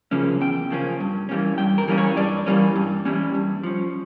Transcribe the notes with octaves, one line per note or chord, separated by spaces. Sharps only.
C#3 F3 A#3 C#4
E2 G5
C#3 F3 A#3 C#4
G2
E3 G3 A#3 C#4
G2 G5
A#4
E3 G3 A#3 C#4
C#5
G2 D5
E3 G3 A#3 C#4
G2
E3 G3 A#3 C#4
G2
F3 C#4